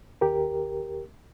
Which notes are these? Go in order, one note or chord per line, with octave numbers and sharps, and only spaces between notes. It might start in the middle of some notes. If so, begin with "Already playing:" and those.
D#2 G4 A#4